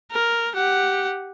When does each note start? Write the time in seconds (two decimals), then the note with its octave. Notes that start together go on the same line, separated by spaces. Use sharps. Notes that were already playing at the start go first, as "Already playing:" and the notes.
0.11 A#4
0.56 G4 F#5